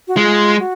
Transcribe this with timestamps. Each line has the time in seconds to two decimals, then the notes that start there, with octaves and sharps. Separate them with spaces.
0.08 F#4
0.16 G#3 F4
0.59 F#4